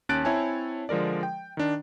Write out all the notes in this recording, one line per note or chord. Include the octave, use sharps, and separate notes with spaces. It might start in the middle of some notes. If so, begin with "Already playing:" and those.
D#2 C#4 A5 F#6 A6 D7
C4 E4 C#5 E5 G#5 A5
D3 F3 G#3 A#4 D5
G5
D#3 D4